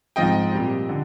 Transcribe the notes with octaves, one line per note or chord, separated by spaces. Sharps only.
G#2 F3 C4 D#5 G5
A#2 G3 C4
D3